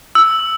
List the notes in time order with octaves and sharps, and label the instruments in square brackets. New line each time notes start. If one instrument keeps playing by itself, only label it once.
[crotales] E6